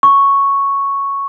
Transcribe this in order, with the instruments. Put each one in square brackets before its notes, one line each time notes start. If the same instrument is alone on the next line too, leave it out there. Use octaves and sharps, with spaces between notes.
[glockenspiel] C#6